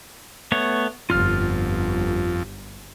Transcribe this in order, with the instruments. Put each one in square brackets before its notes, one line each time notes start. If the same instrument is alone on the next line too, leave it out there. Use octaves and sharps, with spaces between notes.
[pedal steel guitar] A3 B3 C#5
[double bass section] G1 [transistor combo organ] F2 [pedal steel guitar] F4 F6